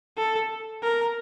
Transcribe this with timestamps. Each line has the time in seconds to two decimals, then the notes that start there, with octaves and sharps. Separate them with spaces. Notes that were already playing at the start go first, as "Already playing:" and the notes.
0.18 A4
0.83 A#4